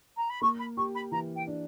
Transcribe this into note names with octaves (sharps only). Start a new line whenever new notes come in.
A#5
B5
A#3 C#6
B5
G4 C#6
B5
E3 A#5
G5
D4